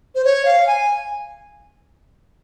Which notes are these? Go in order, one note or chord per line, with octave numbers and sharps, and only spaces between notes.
C5
C#5
F5
G#5